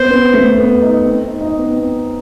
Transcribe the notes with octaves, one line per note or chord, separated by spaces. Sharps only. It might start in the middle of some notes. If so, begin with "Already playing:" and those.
Already playing: B3 C5
B3
A3
B3
D#4
C4
D#4
D#4
B3
C4